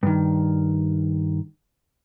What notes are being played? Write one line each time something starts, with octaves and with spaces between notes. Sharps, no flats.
G2 D#3